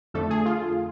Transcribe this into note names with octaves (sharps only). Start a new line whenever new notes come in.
F2 D3 A3 A4
G#4
F4